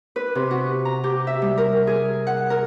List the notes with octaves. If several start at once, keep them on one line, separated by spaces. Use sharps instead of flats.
B4
C3
F#4
A#5
G4
E5
G3
A#4
G#4
F#5
A#4